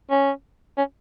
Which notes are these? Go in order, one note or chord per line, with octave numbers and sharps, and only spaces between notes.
C#4
C#4